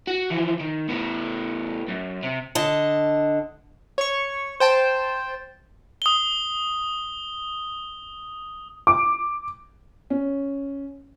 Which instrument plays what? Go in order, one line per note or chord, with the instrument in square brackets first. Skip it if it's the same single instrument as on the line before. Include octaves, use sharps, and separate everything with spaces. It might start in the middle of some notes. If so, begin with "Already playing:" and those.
[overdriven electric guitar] F#4
E3 F3
D#3
A2 B3
F#2
C3
[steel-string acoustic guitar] D3 D#5 A5
[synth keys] C#5 C#6
C5 G5 A5
[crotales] D#6 G7
[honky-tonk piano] D6
[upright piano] C#4